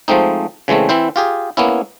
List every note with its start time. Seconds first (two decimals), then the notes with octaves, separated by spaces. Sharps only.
0.08 F3 G#3 A3 C4 D#4
0.68 C#3 E3 G#3 A3 C4
0.89 E3 C4 E4 C5
1.16 F4 G4 G#4
1.57 A#3 B3 C#4 E4